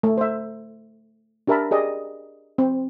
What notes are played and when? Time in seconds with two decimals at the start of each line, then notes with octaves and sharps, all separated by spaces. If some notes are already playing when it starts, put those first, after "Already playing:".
0.03 A3
0.17 C5 E5
1.47 D4 G4 A#4 E5 A5 B5
1.71 G4 G#4 D5 D#5
2.58 C4